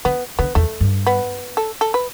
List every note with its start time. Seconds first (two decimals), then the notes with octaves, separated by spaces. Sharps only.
0.05 D3 B3
0.39 D3 B3
0.55 E2 A3
0.80 G2
1.06 B3
1.57 A4
1.81 A4
1.94 B4